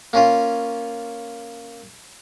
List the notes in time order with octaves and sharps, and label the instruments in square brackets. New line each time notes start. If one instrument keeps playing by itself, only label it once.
[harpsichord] A#3 C#4 F4